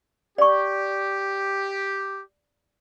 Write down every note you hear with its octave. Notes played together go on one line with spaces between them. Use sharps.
G4 D5 C#6